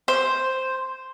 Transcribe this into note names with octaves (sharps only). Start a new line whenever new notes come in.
C5